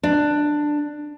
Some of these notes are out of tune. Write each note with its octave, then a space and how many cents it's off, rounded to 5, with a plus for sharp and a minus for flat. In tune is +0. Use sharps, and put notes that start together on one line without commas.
D4 +10